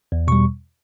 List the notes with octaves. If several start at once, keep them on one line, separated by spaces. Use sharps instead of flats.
E2
B2 G3 C#6